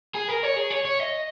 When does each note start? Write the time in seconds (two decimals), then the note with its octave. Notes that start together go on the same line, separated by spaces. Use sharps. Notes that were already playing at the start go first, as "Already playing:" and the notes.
0.15 G#4
0.28 A#4
0.43 C#5
0.56 G#4
0.70 C#5
0.85 C#5
0.99 D#5